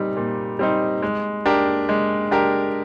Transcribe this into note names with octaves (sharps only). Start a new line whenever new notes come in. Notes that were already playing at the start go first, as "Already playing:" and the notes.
Already playing: A#2 G3 C4 D#4
A#2
G3 C4 D#4
G#3
D4 G4 A#4
G#3
D4 G4 A#4